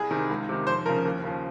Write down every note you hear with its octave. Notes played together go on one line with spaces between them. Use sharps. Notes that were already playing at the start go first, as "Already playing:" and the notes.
Already playing: C2 G#4
C3 D#3
C#2
C3 D#3
F2 C5
C#3 F3 A#4
D#2
C#3 F3